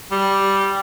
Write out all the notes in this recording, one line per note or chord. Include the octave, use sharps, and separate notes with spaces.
G3